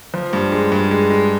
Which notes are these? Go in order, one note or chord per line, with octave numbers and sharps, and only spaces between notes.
F3
G2
G#3
G2
G#3
G#3